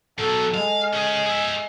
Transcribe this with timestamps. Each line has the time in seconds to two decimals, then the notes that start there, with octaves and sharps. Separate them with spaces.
0.19 B2 F#3 A4
0.54 G#3 F5
0.94 C#4 G#4
1.26 G#4 E5